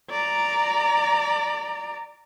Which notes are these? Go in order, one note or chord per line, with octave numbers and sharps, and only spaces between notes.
D5 A#5